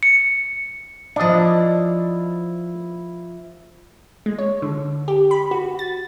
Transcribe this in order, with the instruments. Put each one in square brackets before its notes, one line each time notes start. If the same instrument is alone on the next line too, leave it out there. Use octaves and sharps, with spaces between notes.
[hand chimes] C#7
[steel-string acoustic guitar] F3 E4 [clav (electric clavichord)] D4 D#5
[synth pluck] G#3
C#5
D3
G4
B5
F#4
A6